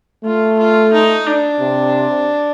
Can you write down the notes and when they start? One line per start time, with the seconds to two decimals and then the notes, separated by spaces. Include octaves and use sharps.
0.25 A3 F4
0.58 F4
0.93 D#4
1.26 D4
1.60 C3